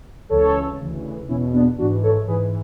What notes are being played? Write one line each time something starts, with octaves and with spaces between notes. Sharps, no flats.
C#2 C#3 E3 A4 C#5
D2 C#3 E3
E2 B2 C#4 E4
B3 D4
G#2 E3 D4 F#4
A4 C#5
G#2 E3 G#4 B4